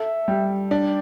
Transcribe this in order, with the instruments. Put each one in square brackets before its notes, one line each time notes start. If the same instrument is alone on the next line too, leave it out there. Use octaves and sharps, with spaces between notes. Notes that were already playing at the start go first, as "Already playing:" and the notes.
Already playing: [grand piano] A4 [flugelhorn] E5
[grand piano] G3
[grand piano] D4 [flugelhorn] D5